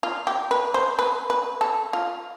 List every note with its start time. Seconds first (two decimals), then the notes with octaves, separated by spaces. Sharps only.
0.03 F4
0.27 G4
0.51 B4
0.74 C5
0.99 B4
1.30 B4
1.61 A4
1.93 F4